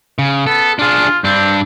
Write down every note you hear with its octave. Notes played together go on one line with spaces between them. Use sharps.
C#3
B3 A4
D4 F4 G#4
G2 C4 D4